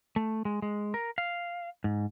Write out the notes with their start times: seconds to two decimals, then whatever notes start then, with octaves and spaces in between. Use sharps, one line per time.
0.16 A3
0.45 G#3
0.62 G#3
0.94 A#4
1.18 F5
1.84 G#2